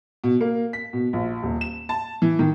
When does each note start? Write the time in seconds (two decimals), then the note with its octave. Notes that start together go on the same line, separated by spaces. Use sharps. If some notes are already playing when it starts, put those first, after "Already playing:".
0.24 B2
0.41 A#3
0.73 B6
0.93 B2
1.13 A#1
1.43 D#1
1.61 E7
1.89 A5
2.22 E3
2.39 D#3